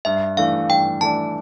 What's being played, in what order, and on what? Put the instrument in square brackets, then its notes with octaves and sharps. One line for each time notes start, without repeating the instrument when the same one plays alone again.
[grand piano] G2 [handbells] E5
[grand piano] E3 A3 D4 [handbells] F5
[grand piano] G2 [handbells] G5
[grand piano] E3 A3 D4 [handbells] A5